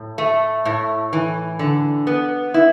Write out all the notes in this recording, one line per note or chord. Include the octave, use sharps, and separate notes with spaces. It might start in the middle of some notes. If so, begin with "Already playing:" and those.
Already playing: A2
A3
A2
E3
D3
B3
E4